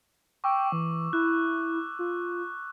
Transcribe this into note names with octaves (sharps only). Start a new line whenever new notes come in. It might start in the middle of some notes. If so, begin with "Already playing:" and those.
G5 C#6 D6 E6
E3
E4 F#6
F4